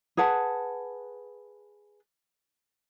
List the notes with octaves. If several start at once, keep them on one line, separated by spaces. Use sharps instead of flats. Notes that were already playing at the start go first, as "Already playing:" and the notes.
G#4 B4 F#5 A5